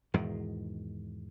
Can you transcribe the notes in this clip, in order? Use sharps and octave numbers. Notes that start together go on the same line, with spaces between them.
E2 G#2 B2 D#3